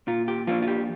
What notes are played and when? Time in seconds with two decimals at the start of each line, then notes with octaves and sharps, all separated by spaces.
0.07 A#2 F4
0.28 G4
0.47 F3 A#3 D4 F4
0.62 F4
0.68 G4